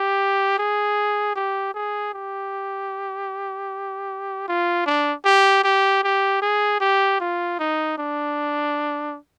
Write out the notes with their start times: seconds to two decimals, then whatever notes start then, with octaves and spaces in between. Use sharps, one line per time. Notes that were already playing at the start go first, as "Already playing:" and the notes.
Already playing: G4
0.58 G#4
1.35 G4
1.74 G#4
2.13 G4
4.48 F4
4.86 D4
5.25 G4
5.64 G4
6.03 G4
6.41 G#4
6.80 G4
7.20 F4
7.59 D#4
7.98 D4